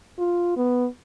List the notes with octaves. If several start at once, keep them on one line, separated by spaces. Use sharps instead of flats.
F4
B3